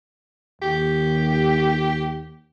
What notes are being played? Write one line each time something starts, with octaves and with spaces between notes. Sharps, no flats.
D#2 G4